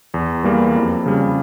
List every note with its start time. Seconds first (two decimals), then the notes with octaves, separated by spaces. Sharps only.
0.14 E2
0.44 E3 G3 A#3
0.75 F2
1.06 C#3 G3